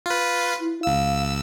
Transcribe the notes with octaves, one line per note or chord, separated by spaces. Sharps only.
F4 B4
E4
C#2 F5 E6